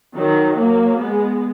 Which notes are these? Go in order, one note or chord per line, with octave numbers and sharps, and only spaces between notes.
D#3 F#3
F#3 A#3
G#3 B3